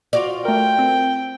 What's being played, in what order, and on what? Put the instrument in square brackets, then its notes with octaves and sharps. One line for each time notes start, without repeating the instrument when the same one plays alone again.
[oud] F4 F#4 D5
[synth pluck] A3 A#4 [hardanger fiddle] G5
[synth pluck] C4